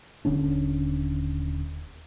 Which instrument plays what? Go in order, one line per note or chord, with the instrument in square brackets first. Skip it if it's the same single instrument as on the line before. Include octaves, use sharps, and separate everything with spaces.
[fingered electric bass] D#1 D3 C#4 D4